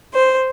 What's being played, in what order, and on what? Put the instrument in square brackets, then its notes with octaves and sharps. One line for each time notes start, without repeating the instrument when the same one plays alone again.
[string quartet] C5